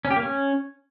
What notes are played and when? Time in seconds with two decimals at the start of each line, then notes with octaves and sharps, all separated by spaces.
0.05 C#4
0.11 G4
0.16 A#3
0.22 C#4